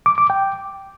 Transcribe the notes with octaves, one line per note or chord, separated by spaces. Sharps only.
D6
D6
G5